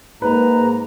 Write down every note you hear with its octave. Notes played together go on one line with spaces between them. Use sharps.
G#2 A#3 B4 A#5